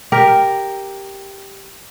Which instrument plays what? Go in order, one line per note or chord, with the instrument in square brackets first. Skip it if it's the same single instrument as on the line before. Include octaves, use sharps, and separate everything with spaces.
[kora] G4 A#4